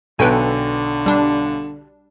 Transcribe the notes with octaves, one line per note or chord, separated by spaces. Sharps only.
B1 D3 A4 B4 G5 G#5
G3 D4